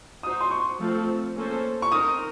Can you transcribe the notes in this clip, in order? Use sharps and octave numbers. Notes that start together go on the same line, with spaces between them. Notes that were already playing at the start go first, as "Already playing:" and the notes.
D#4 F#4 C5 D#6
C6
C#6
F3 A3 C4 F4 A4
A#3 C#4 A4 C5
C#6
C4 D#4 A#4 D#6